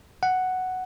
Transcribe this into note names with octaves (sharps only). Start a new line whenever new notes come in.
F#5